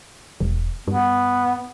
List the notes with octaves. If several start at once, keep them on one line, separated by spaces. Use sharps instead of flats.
E1
G2 B3